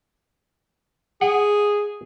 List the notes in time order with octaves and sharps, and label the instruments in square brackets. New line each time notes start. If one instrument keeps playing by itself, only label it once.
[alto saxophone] G#4 [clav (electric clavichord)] F#5